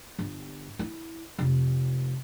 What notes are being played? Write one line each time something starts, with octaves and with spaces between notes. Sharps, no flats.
G1
E4
F1